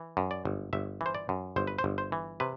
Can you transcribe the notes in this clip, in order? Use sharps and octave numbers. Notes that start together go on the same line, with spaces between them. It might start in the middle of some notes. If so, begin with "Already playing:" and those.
Already playing: E3
F#2
D5
G1
G1 E5
E3
C5
D5
F#2
G1 C5
B4
C5
G1
C5
E3
C3 B4